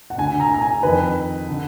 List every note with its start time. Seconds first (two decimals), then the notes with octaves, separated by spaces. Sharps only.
0.10 F#5
0.18 D2 D3 G#5
0.40 A#5
0.54 A#5
0.62 G#5
0.83 F2 D#3 B4
1.48 D3